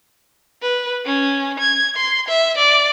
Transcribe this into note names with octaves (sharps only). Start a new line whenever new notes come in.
B4
C#4
G#6
C6
E5
D5